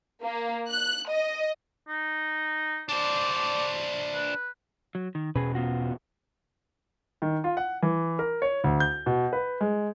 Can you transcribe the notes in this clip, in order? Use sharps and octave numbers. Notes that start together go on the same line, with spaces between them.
A#3
F#6
D#5
D#4
D4 C5 D5
B4
F#3
D#3
E1 B2 C#4 G#4 B4
B3 F4 F#4
D#3
F4
F#5
E3
A#4
C#5
D2
G6
B2
B4
G#3